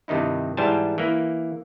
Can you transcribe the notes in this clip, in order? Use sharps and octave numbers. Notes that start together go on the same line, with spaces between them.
G2 C3 D#3 D#4 E4
G#2 E3 G3 C5 G#5 A5
E3 A#3